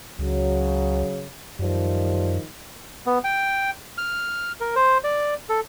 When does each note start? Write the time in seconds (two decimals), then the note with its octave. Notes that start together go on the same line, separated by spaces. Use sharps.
0.19 C#2 C#3 F#3
1.59 F#2 D#3 F3 G3
3.06 B3
3.24 G5
3.98 F6
4.60 A#4
4.76 C5
5.04 D5
5.49 A4